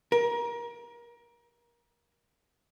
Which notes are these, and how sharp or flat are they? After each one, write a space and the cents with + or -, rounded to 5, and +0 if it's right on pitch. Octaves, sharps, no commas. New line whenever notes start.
A#4 +25